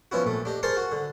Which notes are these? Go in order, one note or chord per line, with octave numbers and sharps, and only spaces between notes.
F3 B3 C#4 E4 F#4
A#1 A3
D4 G4 D#5
G#4 A#4 C5 A5 C6 C#6
F#4
D3